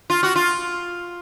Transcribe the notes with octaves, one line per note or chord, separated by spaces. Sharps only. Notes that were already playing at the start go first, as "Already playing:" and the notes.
F4
F#4
F4